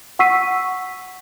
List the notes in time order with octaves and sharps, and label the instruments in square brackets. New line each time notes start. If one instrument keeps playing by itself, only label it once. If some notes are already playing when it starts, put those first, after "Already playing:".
[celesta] F#5 C#6 E6 B6 C7 D#7